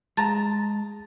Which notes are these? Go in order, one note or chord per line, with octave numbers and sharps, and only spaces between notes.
G#3 A5 A#5 A6